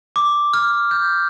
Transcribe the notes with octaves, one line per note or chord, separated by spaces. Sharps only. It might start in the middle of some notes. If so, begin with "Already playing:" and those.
D6
F6
G6